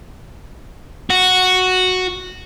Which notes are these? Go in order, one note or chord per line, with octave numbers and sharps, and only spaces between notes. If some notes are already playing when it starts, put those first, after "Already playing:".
F#4